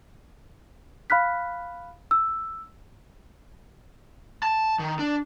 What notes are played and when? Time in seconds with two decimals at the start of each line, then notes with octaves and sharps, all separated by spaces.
1.10 F5 B5 F6 F#6 B6
2.11 E6
4.43 A5
4.79 D#3
4.99 D4